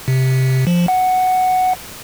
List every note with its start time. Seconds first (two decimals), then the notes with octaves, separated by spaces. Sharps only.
0.08 C3
0.67 F3
0.88 F#5